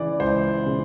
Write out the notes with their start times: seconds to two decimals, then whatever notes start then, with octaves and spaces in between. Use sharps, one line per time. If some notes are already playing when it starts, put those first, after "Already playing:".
Already playing: C#3 E3 D5
0.20 C#2 C5
0.66 C#3